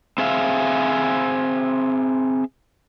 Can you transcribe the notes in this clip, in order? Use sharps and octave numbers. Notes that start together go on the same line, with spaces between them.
C4 G#4 E5 F5